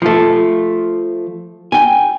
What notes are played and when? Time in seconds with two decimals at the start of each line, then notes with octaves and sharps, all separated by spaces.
0.02 F3 A3
1.72 G5 G#5